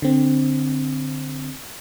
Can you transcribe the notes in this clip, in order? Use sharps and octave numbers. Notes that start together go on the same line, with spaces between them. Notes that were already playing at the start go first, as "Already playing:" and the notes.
D3 C4